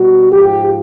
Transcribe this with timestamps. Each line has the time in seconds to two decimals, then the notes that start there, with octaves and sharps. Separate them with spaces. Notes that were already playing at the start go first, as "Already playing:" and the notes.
Already playing: B2 G3 F#4
0.31 G#2 F3 G4